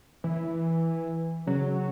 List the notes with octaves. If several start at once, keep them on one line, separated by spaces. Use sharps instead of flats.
E3
C#3 F#3